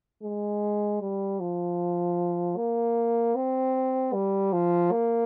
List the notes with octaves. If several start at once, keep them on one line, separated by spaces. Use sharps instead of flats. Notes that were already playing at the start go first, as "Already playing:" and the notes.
G#3
G3
F3
A#3
C4
G3
F3
A#3